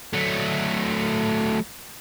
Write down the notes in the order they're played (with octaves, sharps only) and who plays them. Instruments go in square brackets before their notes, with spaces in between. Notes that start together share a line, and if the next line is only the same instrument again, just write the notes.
[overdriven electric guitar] F#3 A3